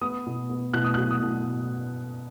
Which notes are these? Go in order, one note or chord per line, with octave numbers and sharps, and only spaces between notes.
B3 D#6
B2
B3
B2 F#6
D#6
F#3 F#6
D#6
B2